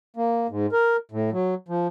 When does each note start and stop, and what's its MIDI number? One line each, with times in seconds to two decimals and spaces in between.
0.16 0.47 58
0.49 0.66 44
0.72 0.97 70
1.12 1.30 45
1.32 1.54 54
1.68 1.87 53